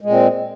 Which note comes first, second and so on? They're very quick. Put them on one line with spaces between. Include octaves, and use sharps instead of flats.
G#3 A#2 C4